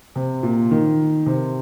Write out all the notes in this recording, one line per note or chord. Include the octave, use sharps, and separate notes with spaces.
C3
A#2
D#3
C3